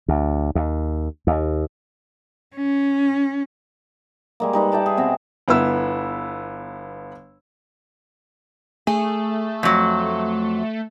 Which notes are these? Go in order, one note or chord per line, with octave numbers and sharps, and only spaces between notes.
D2
D#2
D#2
C#4
G3 G#3 A#3
G3 D#4 B4
E5 G5 A5 D6
G#4
B2 C4
G1 B3 E4 E6
A3 G#4
F2 F#3